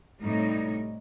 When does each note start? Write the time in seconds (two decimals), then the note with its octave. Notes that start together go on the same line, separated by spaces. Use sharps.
0.21 A2 C3 G3 D#4 C#5